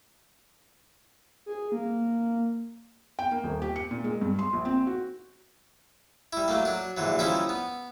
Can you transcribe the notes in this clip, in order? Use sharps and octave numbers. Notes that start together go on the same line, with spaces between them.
G#4
A#3
G5
A#3
D#1
G4
C#7
A#2
G#3
G2
C6
A#1
C4
F#4
G3 E4
F#3 A3 A#3
F#3 D4
A#1 D3 E3 F#3
F3 G3 C#4 D#4 E4 E5
B3